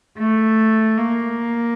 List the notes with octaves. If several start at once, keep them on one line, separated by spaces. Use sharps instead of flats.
A3
A#3